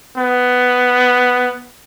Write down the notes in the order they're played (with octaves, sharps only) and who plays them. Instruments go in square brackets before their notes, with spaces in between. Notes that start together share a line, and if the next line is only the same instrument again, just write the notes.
[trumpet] B3